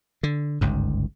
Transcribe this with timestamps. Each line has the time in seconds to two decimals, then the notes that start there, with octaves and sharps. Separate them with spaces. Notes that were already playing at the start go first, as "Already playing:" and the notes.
0.23 D3
0.61 G1 C#2 G#2